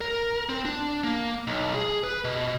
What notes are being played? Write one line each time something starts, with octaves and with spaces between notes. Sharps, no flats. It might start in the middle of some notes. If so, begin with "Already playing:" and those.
A#4
C4
D4
A#3
B1
G#4
B4
B2